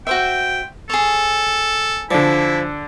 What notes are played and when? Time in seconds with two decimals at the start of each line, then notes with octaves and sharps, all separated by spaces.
0.07 F#4 C5 E5 G5
0.90 G#4 A4 C#5
2.11 D3 F3 E4 D5